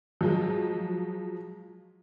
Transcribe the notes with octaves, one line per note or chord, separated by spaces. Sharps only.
F3 F#3 G#3